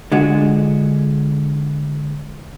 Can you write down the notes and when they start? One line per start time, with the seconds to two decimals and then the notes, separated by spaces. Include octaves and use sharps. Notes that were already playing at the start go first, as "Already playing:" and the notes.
0.12 D3 G#3 F4 F#4